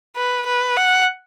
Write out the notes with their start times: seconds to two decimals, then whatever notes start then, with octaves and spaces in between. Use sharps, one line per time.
0.17 B4
0.47 B4
0.77 F#5